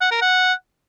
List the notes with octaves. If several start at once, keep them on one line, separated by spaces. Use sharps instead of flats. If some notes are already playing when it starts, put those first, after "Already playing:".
F#5
A#4
F#5